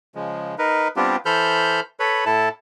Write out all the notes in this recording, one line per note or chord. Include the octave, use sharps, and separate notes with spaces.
C#3 F3 G#3
D#4 A#4 B4
G3 B3 C4 D4 F4 G4
E3 A4 C5 B5 F6 G6
A4 B4 C#5 B5
A2 E4 A4 A5